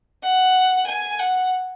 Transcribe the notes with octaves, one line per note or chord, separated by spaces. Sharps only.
F#5
G#5
F#5